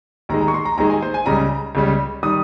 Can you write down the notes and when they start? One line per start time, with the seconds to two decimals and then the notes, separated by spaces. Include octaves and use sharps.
0.29 D#2 D#3 G#3 A#5
0.41 A#5
0.48 C#6
0.54 C6
0.65 A#5
0.78 D#2 D#3 G#3 A#5
0.90 G#5
1.02 C5
1.14 G#5
1.26 C#2 C#3 G3 A#5
1.75 C#2 C#3 G3
2.23 D#3 G3 D#6